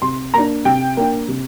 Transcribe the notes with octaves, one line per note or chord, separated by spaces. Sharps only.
C3 C6
A#3 D4 A#5
C3 G5
A#3 D4
C3